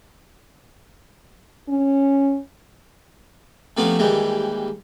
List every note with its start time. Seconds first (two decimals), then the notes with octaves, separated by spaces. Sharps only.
1.69 C#4
3.77 C3 F3 A3 B3 C#4
3.99 D#2 E3 G3 G#3